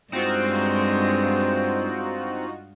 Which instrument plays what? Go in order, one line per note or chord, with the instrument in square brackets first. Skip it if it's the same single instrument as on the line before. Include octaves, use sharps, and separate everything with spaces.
[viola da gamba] G2 G#3 [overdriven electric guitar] C4 [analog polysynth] D#4 F4 F#4 [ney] C5